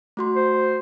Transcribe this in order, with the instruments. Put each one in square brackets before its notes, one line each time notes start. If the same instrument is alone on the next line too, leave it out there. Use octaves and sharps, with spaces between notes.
[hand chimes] A3 F#4 C6
[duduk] C5